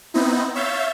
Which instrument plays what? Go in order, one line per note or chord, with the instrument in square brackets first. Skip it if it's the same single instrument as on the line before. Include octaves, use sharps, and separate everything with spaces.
[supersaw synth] B3 C4 D#4 E4
C#5 E5 F5 G6 A6